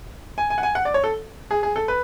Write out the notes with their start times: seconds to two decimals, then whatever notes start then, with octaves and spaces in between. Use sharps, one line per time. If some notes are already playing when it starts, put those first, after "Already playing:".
0.38 G#5
0.50 G#5
0.58 F#5
0.63 G#5
0.75 F#5
0.85 D5
0.94 C#5
1.04 A4
1.51 G#4
1.63 G#4
1.76 A4
1.88 B4